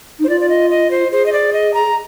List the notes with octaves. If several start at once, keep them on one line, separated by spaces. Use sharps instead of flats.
D#4
C5
F4 D5
D5
D#5
D#5
C5
G#4 C5
D#5
D5
D#5
A#5